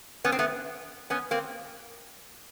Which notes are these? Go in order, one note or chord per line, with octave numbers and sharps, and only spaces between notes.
B3 C#4
C4
A3 B3
B3 C#4
A#3 C4